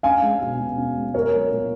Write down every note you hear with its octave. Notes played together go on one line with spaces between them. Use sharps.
C#4 F5 G#5
G#3
B2
B2
C#4
G#3
B3 A#4 C#5
F#3
A#2